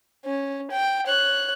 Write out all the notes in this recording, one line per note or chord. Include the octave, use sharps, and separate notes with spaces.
C#4
G5
C#5 F#6